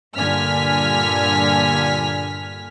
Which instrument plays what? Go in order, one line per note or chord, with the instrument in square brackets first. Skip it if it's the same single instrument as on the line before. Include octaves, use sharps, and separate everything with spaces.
[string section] G2 A#2 D3 G#5 F6 B6